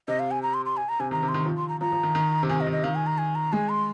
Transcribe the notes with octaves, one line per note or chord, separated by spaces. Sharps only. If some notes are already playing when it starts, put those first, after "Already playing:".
C3 D#5
F5
G#5
A#5
C6
C6
G#5
A#5
C3 G#5
D#3 A#5
C3
C6
D#3
F3
C6
A#5
F3 A#5
F3
D#3
D#3
C3
D#3 G#5
D#5
D#3
D#5
D#3 F5
G#5
A#5
G#5
A#5
G#3 G#5
C6